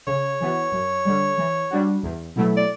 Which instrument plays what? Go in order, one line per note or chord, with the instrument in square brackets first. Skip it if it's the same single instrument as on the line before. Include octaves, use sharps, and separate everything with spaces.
[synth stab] C#3 [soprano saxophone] C#5
[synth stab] E3 B3 F#4
F#2
D3 G3
E3
G3 D4 F#4
E2
B2 F#3 A3 E4
[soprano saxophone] D5